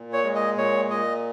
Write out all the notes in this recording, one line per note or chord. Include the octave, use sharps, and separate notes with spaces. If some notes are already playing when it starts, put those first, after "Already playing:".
Already playing: A#2
C#5
G#3
D#5
A#2 C#5
A#2 D#5